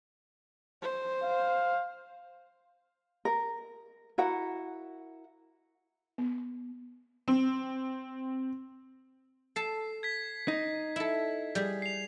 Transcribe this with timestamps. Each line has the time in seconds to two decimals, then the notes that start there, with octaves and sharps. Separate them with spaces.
0.82 C5
1.24 F5
3.25 A#4
4.18 E4 F#4 A#4 F#5
6.18 B3
7.28 C4
9.56 A4 A5 C7
10.03 G#6 B6
10.48 D#4
10.96 E4 A4
11.55 G3 G#4
11.82 C7 F7